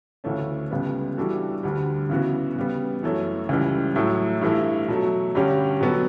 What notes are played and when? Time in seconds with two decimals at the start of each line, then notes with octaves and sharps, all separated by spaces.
0.24 D2 C#3 E3 A3 C#4
0.71 C#2 C#3 G3 B3
1.17 E3 G3 D4 F#4 A4
1.63 D2 D3 G3
2.10 C#3 E3 B3 F#4
2.56 C#3 G3 B3
3.03 F#2 E3 A3 C#4
3.49 C#2 C#3 E3 G3
3.95 A2 F#3 A3 E4
4.42 G2 E3 A3 E4
4.88 B2 F#3 A3
5.35 G2 D3 G3 C#4 G4
5.81 B2 F#3 B3 F#4 A4